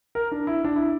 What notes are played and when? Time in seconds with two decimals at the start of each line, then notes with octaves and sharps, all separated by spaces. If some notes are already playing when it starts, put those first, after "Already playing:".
0.15 A#4
0.32 D4
0.47 E4
0.64 D4
0.76 E4